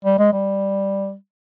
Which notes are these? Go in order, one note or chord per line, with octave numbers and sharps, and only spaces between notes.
G3
G#3
G3